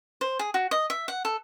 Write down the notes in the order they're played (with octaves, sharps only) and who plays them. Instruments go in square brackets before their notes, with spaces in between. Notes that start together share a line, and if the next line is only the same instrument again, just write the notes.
[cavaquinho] C5
G#4
F#4
D#5
E5
F#5
A4